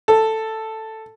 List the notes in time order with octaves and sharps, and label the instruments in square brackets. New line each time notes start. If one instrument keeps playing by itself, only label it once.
[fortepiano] A4